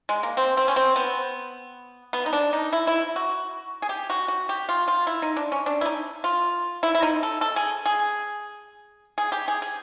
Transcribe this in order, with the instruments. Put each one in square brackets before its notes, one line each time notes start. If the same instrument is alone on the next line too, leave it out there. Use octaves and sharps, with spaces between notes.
[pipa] G#3
A#3
C4
C4
C#4
C4
B3
B3
D#4
D4
D#4
E4
E4
F#4
G#4
G4
F#4
F#4
G4
F4
F4
E4
D#4
D4
C#4
D4
E4
D#4
F4
E4
E4
D#4
A4
A4
G#4
G#4
G#4
G4
G#4
G#4